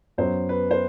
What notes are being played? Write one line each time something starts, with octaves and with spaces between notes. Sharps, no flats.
F#2 F#3 B3 C5
B4
C5